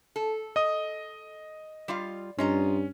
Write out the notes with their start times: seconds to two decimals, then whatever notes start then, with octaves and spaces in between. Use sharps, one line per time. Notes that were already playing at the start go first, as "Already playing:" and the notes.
0.16 A4
0.56 D#5 D#6
1.88 G3 F4 F5
2.38 G2 C#4 F4 D#5 A#5